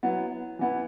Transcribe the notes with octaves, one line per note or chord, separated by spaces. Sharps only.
F#3 B3 E4
E3 B3 E4